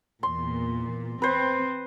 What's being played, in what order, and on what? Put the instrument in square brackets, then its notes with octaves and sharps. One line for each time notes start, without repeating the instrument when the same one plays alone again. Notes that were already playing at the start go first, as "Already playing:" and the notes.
[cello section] E2 A#2 [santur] C6
[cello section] C4 [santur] B4 C5